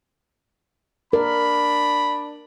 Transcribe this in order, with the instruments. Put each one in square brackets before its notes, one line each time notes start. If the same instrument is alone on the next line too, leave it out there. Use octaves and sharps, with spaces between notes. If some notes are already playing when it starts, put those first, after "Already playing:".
[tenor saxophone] D4 [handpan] A#4 [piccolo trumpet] B5